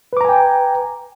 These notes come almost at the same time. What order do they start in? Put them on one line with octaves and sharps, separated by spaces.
B4 D6 A#5 G#5 G5